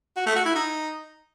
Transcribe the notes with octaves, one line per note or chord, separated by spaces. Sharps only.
F#4
A3
F#4
E4
D#4